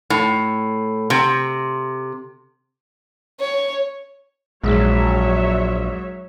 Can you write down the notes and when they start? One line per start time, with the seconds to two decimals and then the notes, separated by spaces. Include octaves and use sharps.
0.10 A2
1.10 C3
3.40 C#5
4.64 A#1 G#2 F#3 C#5 E5